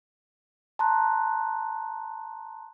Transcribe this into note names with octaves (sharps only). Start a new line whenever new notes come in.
A5 A#5 C6 F#6